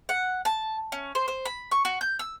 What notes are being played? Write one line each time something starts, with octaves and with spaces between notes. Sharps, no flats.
F#5
A5
C#4
C5
C5
B5
C#6
F#4
G6
E6